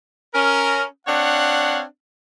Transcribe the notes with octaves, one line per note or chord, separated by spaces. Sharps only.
C#4 A#4
C4 D4 C#5 F5 F#5